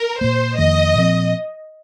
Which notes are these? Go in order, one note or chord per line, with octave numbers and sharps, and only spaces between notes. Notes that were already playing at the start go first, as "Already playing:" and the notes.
Already playing: A#4
A#2 A#3 C5
F2 D#3 A#3 D#5
A#2 F3 C4